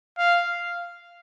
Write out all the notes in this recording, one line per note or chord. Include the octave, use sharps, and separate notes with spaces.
F5